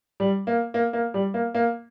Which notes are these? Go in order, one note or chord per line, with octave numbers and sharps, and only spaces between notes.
G3
A#3
A#3
A#3
G3
A#3
A#3